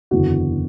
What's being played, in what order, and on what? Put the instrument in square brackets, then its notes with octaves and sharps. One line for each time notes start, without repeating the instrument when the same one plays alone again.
[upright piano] F#1 E2 D3 F#4